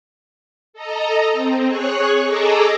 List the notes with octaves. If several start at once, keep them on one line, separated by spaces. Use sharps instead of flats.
A4 D#5 A#5
C4
G#4 C#5 C#6 F#6
G#4 A4 D#5 A#5 D6 E6